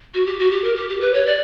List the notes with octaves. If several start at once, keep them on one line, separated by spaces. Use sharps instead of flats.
F#4
G4
F#4
G4
A#4
G4
G4
B4
C#5
D5